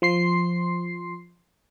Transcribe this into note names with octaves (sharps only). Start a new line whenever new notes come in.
F3 C6 C7